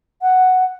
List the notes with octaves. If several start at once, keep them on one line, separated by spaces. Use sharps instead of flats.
F#5